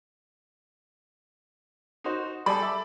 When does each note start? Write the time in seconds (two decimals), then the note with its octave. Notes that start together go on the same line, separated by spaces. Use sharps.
2.04 D#4 F#4 C5
2.46 G3 G#4 A4 D5 B5
2.63 E5